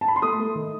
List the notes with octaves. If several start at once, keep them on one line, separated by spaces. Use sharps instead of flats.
A5
B5
C6
A3 D#6
A3
D#3